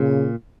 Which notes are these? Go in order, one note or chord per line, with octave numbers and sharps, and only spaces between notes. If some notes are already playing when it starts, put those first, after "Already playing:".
Already playing: A#2 C#3